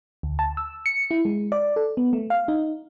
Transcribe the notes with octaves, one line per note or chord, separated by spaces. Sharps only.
D2
A5
E6
C#7
E4
G#3
D5
A4
B3
A3
F5
D#4